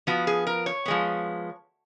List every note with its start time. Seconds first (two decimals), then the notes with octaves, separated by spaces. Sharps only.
0.07 F3 B3 F#4
0.27 G#4
0.47 A#4
0.66 C#5
0.86 F3 G#3 B3